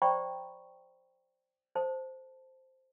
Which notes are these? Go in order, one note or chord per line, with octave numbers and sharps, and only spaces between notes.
C5 D5 G5 A#5 B5 C#6
A4 C5 A5